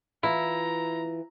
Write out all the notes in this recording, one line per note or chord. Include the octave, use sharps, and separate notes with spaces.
E3 E4 F4 A#5